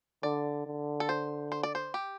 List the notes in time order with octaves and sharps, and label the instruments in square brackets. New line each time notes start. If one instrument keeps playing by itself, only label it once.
[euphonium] D3 [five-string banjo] D5
[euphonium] D3
[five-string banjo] A4
C5
C5
D5
C5
G4